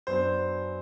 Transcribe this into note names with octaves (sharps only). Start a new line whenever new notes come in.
F#2 F#3 B3 D4 C5